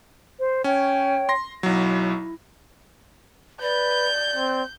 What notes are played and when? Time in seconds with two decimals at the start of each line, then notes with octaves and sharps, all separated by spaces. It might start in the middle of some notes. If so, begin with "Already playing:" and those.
0.38 C5
0.64 C#4 C#5 G5
1.29 C6 A#6
1.63 B1 F#3 E4
3.62 B4 D5 G6
4.36 C4